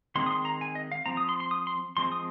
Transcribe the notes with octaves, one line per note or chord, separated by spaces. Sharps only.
D#3 G#3 C4 C6
D#6
C6
A#5
G#5
D#5
F5
F3 C4 A#5
D#6
C6
C6
D#6
C6
F3 G#3 C4 C6
D#6